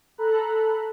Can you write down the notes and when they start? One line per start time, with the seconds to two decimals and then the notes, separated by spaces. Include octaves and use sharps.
0.18 A4 A#5 B5 F#6